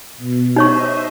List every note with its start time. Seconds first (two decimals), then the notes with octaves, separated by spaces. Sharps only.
0.18 B2
0.56 D#4 C5 C#5 D#5 E5 C#6